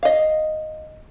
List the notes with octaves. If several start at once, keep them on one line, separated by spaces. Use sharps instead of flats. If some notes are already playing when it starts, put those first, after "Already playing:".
D#5 F5